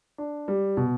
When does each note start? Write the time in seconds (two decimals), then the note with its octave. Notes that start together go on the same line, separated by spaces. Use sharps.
0.18 D4
0.48 G3
0.77 B2